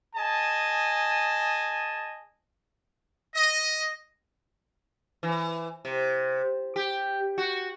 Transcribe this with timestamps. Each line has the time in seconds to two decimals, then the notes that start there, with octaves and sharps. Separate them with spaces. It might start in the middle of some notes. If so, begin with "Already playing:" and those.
0.16 G#4 D#5 G#5 A5
3.35 D#5
5.23 E3
5.85 C3
6.76 G4
7.38 F#4